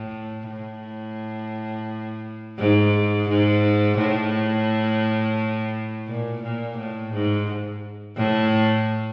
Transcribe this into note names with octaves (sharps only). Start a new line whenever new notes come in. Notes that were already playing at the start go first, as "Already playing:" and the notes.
Already playing: A2
A2
G#2
G#2
A2
A#2
A#2
A2
G#2
A2